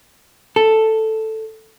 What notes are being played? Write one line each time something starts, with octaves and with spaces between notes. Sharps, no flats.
A4